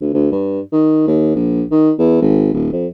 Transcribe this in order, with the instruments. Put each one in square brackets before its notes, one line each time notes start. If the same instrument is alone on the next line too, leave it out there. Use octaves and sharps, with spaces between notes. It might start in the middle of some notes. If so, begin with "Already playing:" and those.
[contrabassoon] D2
D2
G2
D#3
D#2
A#1
D#3
E2
G#1
D#1
F2